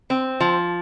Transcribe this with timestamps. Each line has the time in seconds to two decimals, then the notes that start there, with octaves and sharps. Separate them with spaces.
0.10 C4
0.40 F3